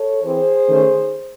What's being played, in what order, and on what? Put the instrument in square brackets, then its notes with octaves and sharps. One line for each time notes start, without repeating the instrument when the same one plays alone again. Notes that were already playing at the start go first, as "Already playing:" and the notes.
Already playing: [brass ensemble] A4 C#5
E3 C4 G#4 C5
D#3 A3 C#4